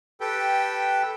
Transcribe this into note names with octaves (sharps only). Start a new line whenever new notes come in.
G4 A4 B4 G5